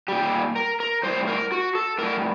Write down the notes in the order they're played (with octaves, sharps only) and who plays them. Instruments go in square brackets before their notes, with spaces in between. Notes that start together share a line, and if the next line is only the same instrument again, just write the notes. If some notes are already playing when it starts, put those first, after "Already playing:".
[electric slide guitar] A#2 G3 G4
A#4
A#4
A2 G3 C5
A#4
F#4
A4
A2 G3 A#4